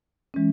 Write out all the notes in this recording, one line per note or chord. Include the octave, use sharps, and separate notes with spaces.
E3 G#3 C#4